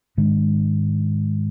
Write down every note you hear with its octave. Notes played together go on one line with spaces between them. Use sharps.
G#2 D#3 G#3 D4